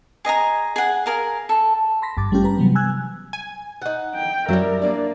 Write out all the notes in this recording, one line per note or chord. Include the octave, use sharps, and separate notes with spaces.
G#4 D#5 G#5 A#5
G#4 F#5
G#4 A#4 F5
A4
B5 C6 A#6 B6
G#1 G2 A5 D6 A6
G3 A3 C#4 F4 G4
B4 A#5
C3 E3 F#3 G3 B3
G#5 E6 F#6 G#6
G#5
D#4 F#5
G5
F#2 F#3 G3 E4 A#4
A#3 D4 D5